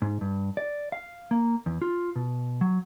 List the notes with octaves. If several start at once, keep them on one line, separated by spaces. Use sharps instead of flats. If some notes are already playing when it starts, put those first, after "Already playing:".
G#2
G2
D5
F5
A#3
E2
F4
B2
F#3